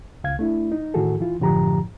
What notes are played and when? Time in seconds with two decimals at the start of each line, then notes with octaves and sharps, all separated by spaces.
0.24 C#2 F5 G#6
0.39 A3 D4 E4
0.72 D#4
0.94 A2 D#3 E3 F#4 G#4 A4
1.20 E3 F4
1.40 F#2 A2 D3 F3 G4 A#5